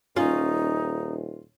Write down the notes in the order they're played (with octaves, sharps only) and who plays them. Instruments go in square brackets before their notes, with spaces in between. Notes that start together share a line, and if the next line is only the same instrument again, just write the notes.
[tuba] D#1 [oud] C#4 [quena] D#4 [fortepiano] F4